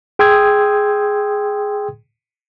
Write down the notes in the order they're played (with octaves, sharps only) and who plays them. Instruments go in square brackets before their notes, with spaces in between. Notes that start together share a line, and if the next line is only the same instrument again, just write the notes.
[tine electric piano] G#4 G5 C6 D#6 E6 G#6